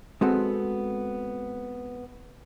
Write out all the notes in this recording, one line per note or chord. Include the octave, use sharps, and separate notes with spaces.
G#3 B3 C4 F#4 A4